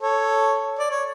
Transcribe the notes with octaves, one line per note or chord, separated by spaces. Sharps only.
A4 C#5
D5
C#5